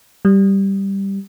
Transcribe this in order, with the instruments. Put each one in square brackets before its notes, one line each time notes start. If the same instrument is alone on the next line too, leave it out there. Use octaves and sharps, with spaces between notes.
[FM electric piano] G3